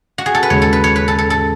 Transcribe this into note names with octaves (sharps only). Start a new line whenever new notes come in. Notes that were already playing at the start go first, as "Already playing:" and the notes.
F#4
G#4
A4
B4
D#2 C#3 G#3 C#4 G#4 C#5
A4
B4
C#5
B4
A4
A4
A4